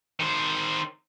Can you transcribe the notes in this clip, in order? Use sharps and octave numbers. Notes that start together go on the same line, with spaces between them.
D#3 C5